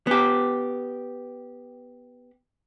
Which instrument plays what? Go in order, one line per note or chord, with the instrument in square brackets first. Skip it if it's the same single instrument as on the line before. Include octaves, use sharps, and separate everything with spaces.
[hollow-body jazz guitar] B3 G4